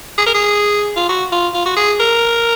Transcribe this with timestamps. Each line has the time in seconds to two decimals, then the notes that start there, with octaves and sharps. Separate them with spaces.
0.18 G#4
0.26 A#4
0.34 G#4
0.96 F4
1.09 F#4
1.32 F4
1.54 F4
1.66 F#4
1.76 G#4
2.00 A#4